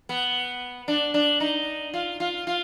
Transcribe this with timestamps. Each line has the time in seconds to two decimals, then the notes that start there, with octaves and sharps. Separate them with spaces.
0.09 B3
0.88 D4
1.14 D4
1.40 D#4
1.94 F4
2.20 F4
2.47 F4